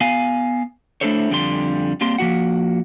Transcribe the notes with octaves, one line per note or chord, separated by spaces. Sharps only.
B3 F5 G#5
A3 D4 E4 A4 C5 C#5
F2 D3 G3 C6
G3 A#3 C4 G4 C6
F3 A#3 F#4 F#5